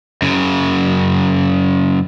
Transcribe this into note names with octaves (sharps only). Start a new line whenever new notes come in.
F#2 C#3